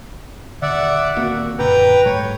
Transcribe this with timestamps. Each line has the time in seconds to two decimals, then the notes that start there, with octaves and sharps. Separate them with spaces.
0.62 D#1 D3 D5 E5 F#5
1.17 D#1 A#3 C4 F#4
1.59 F#2 A#2 D3 B4 G5 A#5
2.06 G#2 G3 A3 C#5